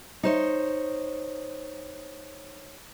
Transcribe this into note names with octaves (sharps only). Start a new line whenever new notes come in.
D#4 C5 C#5